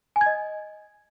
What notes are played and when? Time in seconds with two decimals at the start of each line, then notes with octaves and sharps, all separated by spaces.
0.16 G#5
0.21 G#6
0.26 D#5